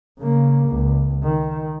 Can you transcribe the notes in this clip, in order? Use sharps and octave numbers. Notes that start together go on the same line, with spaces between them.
C#3 A#3
C#2
D#3